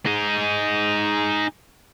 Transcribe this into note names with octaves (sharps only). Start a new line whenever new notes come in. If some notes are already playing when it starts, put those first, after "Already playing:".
D#4 G#4